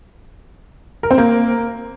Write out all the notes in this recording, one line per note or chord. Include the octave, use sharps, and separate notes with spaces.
A#4
C4
A#3